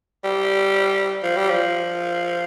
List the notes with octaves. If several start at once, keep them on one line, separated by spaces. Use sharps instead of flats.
G3
F3
G3
F3